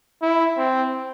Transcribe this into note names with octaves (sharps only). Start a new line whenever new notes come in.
E4
C4